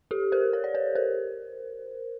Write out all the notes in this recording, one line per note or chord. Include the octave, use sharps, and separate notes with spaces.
G4 A4
A#4 C5
C#5
D5
B4 C#5
A#4 C5